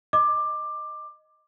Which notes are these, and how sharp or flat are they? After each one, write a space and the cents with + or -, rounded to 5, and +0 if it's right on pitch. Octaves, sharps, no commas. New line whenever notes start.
D#5 +0 D6 +15